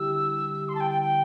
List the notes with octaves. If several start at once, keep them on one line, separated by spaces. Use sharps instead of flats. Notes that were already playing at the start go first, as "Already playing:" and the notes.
Already playing: D3 G3 E4 G4 E6
C6
A5
G5
G5
G5